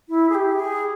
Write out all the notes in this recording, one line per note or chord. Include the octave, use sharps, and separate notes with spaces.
E4
G#4
G4
G#4